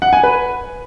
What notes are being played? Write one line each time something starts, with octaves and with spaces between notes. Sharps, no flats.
F#5
G#5
B4